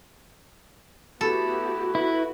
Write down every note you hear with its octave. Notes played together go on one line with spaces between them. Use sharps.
A3 B3 E4 F#4 G4 A4
E4 F#4 B4